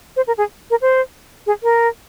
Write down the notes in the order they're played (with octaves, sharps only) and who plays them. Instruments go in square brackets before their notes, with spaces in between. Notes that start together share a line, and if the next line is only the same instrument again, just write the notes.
[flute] C5
A#4
G#4
A#4
C5
G#4
A#4